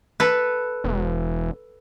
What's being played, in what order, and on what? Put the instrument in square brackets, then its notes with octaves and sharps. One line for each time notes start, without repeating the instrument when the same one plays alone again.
[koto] A4 B4
[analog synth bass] E1